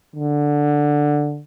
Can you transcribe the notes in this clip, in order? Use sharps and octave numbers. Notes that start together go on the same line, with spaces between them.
D3